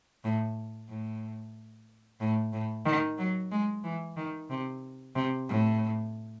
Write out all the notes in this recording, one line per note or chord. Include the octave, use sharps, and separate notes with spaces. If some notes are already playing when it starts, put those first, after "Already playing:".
A2
A2
A2
A2
D#3
F#3
G#3
E3
D#3
C3
C3
A2